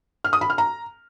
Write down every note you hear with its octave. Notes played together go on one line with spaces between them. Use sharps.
F6
D#6
B5
F6
A#5